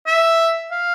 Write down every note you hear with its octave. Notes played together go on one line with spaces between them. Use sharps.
E5
F5